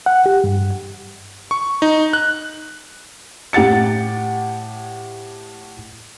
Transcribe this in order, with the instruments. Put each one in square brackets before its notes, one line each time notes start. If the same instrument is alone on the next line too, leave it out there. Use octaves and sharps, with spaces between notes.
[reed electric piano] F#5
G4
G2
[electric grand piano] C#6
D#4
F#6
[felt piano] A2 G4 F#5 A6 C#7